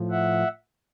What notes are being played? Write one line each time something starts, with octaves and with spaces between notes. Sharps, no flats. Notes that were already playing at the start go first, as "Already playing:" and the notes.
Already playing: A2 F3
E5 F#5